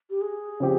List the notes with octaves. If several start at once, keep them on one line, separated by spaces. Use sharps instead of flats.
G4
G#4
C#3 F3 C4 G4